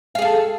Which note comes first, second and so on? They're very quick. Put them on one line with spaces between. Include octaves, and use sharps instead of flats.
F5 G#4 A4